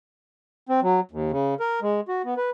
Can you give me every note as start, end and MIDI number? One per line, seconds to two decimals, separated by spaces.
0.69 0.80 60
0.82 1.00 54
1.11 1.31 39
1.32 1.54 49
1.60 1.80 70
1.82 2.01 56
2.08 2.22 66
2.25 2.34 59
2.37 2.50 71